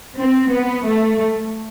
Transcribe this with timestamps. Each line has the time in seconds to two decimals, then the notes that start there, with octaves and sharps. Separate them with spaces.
0.17 C4
0.51 B3
0.86 A3